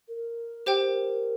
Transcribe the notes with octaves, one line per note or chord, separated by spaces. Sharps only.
A#4
G4 C5 G5